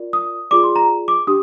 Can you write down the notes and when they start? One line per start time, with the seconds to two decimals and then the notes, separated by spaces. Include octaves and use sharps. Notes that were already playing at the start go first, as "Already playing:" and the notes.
Already playing: F4 A#4 D5
0.13 D#6
0.51 F4 G#4 D5 D6
0.63 C6
0.76 A#5
1.08 D6
1.27 D4 G4 D#6